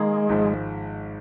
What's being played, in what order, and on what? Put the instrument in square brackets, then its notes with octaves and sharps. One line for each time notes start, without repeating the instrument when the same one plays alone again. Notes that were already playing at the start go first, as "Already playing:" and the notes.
Already playing: [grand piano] D#3 A#3 G#4 [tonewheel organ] G#3
[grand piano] G#1 G#2 F3